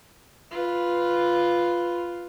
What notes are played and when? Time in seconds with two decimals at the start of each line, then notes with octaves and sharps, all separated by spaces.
0.51 F4 B4